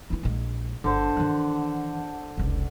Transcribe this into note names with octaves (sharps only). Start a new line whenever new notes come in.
E3 E4
A#1 G#3
G1 D3 C5
D#3 E3 F#5
F1 C#2